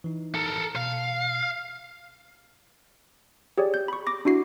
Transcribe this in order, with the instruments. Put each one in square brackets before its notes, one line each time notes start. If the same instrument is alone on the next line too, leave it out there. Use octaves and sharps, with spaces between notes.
[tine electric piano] E3 D#4
[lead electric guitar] A4 A#4
[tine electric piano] B2 [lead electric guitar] F5
[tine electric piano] F6
[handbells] G4 G#4 C#5 D5
G6
B5 C#6
D6 A#6
D4 E4 F#4 C7